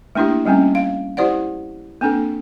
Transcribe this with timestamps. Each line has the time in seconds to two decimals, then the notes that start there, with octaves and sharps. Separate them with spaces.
0.15 A3 A#3 D4 E4 G4
0.46 G3 A3 A#3 C4 C#4
0.75 F5
1.17 E4 G4 C5 D5 F#5
2.01 A#3 C4 D4 A4